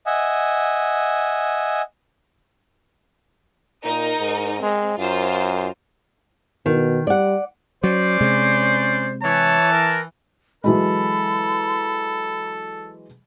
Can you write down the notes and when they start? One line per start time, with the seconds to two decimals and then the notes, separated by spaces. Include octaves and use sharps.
0.06 D#5 E5 F#5 G#5
3.84 A#2 D#4 A#4 D#5
4.19 G#2
4.62 G#3 C4
4.98 F#2 F4 A#4 C5
6.66 B2 D#3
7.07 G3 D5 F#5
7.84 F#3 C#4 C5 D5
8.21 C3 G#3
9.23 E3 C#5 A5
9.73 A#4
10.64 E3 F#3 G#3 A4 B5